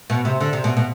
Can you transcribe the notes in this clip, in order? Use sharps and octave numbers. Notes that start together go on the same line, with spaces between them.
B2
C3
D3
C3
B2
B2